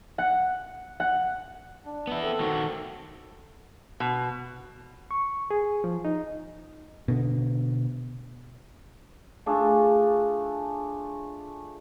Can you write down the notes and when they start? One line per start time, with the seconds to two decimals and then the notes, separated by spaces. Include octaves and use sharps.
0.18 F#5
1.00 F#5
1.86 D4
2.07 B3 E4
2.23 C4 A4
2.40 D#3 F#4
4.00 B2
5.11 C#6
5.51 G#4
5.84 F3
6.05 D#4
7.08 B2 D3
9.46 A3 D4 F4 G#4